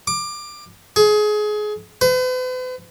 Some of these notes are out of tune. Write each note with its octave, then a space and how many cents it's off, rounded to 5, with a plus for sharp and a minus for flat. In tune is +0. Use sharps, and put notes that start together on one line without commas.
D6 +20
G#4 +25
B4 +45